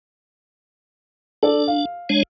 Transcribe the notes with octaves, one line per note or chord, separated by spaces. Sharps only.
D4 A4 D5
F5
G#3 D4 C#5